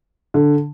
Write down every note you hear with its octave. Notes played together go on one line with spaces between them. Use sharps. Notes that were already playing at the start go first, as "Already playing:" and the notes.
D3